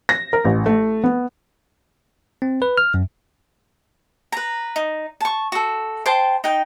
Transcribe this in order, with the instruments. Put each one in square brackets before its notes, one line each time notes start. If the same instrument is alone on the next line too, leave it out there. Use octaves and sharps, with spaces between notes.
[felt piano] A#6
A#4
A1
A3
B3
[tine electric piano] C4
B4
F6
F#2
[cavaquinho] B4 A#5
D#4
A5 C#6
F#4 A4
C5 G5 A5 C6
D#4 G5